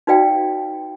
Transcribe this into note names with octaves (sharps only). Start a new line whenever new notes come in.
D#4 F#4 B4 D5 F5 G5